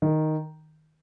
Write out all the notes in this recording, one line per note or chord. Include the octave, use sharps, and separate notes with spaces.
D#3